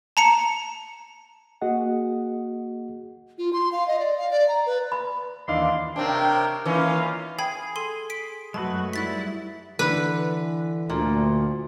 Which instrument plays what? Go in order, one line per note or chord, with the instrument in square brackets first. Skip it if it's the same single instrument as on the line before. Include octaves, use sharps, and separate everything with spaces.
[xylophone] A5 A#5 C#7
[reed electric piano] A#3 F#4 G#4 D#5 F#5
[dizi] F4
C6
F5
D#5
D5
F5
D5
A#5
B4
[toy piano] B5
[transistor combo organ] D#2 E3 D4 [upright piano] D#5 F5 [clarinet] C6
[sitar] C3 C4 D4 [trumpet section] A#4 C#5 G5
[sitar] E3 C#4 D#4 [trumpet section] A#3 F4 F5
[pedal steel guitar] G#4 [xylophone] G5 B5 G#6
[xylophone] A4 C6 D#7
B6 D7
[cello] F#2 F#4 [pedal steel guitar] G#3 A3 B4 [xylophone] A5
[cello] G3 E4 [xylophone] F#6 A6 B6
[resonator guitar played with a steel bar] D3 [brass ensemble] E3 [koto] B4
[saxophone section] D2 [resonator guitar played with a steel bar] A#2